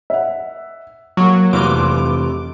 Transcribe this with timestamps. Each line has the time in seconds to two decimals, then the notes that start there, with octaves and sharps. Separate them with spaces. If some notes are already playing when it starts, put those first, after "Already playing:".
0.10 E5 F#5
1.17 F#3 A#3 C#6
1.53 F1 C3 E3 F4 D6